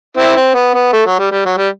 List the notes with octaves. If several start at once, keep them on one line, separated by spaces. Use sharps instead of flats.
C4 E4
C4
B3
B3
A3
F#3
G3
G3
F#3
G3